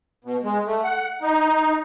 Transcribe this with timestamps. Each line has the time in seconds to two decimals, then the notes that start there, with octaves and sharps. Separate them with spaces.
0.25 B2
0.44 G#3
0.66 A3
0.84 F#5
1.22 D#4